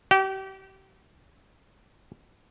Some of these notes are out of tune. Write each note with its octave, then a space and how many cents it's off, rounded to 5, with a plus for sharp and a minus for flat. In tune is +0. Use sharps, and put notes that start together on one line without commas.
G4 -35